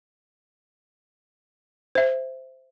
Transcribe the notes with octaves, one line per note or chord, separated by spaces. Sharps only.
C5 E5